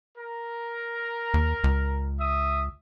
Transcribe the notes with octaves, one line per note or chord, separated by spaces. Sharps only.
A#4
D#2
C#2
E5 D#6